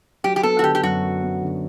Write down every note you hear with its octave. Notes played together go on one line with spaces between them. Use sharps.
F#3 G4
G4
B3 A4
F#4
D3 G4
G4
F#2 F#4
F#3
B3
D3